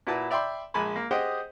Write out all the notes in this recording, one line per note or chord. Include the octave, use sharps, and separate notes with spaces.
A#2 E4 F#4 B4 A5
D5 E5 G5 B5 C6
A#1 G#3 G#5 A5 B5
A#3
G4 G#4 C5 D#5 F#5 G5